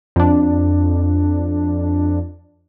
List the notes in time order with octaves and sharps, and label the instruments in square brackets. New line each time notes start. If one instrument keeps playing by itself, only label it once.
[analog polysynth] F2 D4